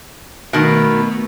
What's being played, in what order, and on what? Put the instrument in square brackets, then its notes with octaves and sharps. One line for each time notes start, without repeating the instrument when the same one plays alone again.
[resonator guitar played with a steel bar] B2 D#3 [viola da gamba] A3 B3